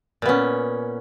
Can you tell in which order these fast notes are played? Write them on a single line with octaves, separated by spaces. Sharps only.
A#2 B3 C#4